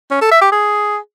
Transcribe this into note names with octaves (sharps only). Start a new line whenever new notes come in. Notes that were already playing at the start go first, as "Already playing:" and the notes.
C#4
A4
E5
G4
G#4